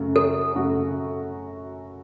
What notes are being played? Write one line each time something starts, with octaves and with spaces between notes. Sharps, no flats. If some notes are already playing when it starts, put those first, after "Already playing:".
Already playing: F#2 C#3 A3 F#4
A4
F#2 C#3 A3 F#4